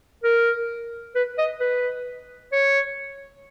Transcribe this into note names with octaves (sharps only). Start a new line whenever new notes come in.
A#4
B4
D#5
B4
C#5